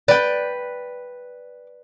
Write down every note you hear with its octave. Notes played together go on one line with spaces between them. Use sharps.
B4 D5 G5